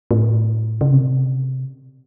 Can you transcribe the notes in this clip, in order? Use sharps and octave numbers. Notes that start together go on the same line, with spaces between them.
A2
C#3
C3